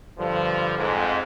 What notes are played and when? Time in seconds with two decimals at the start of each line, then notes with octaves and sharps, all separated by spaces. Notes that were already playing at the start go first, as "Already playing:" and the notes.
0.18 G2 D3 F3
0.78 F2 G#2